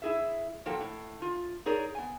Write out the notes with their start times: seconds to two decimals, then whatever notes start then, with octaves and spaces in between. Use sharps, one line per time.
0.02 E4 G#4 E5
0.66 F3 F#3 A#3 A4 G5
0.81 A2
1.22 F4
1.66 D#4 G#4 A#4 C#5 D5
1.95 B3 G#5